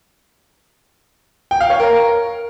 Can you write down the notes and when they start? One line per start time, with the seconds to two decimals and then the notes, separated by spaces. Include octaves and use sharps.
1.51 G5
1.61 F5
1.70 C#5
1.80 A#4